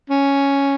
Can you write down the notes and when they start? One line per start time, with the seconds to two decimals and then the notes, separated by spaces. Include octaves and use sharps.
0.10 C#4